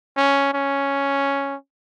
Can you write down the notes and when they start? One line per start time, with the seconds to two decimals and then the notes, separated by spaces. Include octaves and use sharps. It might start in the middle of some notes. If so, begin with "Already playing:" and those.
0.17 C#4
0.54 C#4